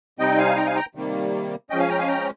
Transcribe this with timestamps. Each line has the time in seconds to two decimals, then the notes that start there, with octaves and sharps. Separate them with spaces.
0.19 C3 G3 C4 D#4 D#5 G5
0.38 F5 G#5
0.56 G5 A#5
0.66 F5 G#5
0.76 G5 A#5
0.95 C3 D#3 G3 A#3
1.70 F3 G#3 C#4 D#5 G5
1.79 F5 G#5
1.89 G5 A#5
1.98 F5 G#5
2.08 G5 A#5